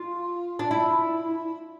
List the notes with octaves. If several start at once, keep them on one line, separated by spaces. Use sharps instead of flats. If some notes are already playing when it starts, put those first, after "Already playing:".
Already playing: F4
D4
E4